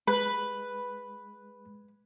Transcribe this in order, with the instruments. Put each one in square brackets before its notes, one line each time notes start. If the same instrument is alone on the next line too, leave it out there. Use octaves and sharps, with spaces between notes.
[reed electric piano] G#3 [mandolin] B4